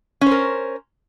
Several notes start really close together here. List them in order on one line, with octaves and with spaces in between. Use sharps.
C#4 C5 A#4